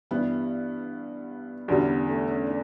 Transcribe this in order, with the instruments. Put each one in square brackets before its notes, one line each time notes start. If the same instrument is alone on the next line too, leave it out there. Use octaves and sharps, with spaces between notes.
[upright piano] G2 E3 G3 [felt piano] B3
[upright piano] E2 D3 G3 [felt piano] C#4
[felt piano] B3
A3
C#4
D4